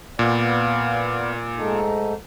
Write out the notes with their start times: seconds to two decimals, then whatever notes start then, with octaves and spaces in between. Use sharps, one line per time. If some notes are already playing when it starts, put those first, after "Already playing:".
0.19 A#2 B3 D5 F5
1.57 G#2 A3 D#4